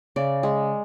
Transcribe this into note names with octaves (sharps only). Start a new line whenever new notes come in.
C#3 D5
G#3